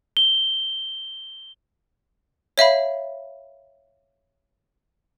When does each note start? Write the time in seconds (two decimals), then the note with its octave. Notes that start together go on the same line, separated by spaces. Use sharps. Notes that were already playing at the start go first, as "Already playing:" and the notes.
0.17 G7
2.58 C#5 E5 F5 B5